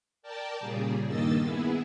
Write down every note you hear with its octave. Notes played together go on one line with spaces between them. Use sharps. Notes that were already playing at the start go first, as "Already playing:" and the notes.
A#4 D5 G5 A5
A#2 C#3 G3 G#4
G2 D#3 A#3 D#5 E6 A6
B3 E4 G#4